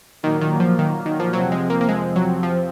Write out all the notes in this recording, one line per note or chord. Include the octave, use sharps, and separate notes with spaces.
A#2 D#3 F#3 A#3
D#3
F3
D#3
D#3
F3
F2 C3 F3 F#3 C4
G#3
A#3
A#3
G#3
F#3
F3